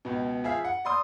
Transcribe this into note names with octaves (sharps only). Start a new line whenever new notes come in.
C#2 B2
F3 G#4 E5 F5
F#5
D5 C6 D#6